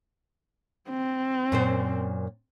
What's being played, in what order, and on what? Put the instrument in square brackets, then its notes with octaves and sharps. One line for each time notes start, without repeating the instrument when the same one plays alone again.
[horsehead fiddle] C4
[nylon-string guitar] F#2 A#2 C5